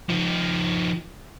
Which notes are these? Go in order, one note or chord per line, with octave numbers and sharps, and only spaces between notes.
F3 D#4